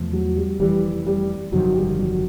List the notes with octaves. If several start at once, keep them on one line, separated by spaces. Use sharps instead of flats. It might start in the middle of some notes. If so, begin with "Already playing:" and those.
Already playing: E2 C3 F3 A3
F#3
G3
F1 F2 C3 E3 G3
G3
G1 F2 C3 D#3 F#3
G3
F#3